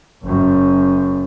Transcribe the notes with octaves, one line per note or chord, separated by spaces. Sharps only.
F#1 F#2